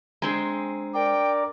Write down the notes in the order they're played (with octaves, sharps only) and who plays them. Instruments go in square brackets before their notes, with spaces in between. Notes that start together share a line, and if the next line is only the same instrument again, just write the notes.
[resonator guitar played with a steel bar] G#3 C4 G#4 [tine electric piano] D4 A#5
[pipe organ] A#4 D5 [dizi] G5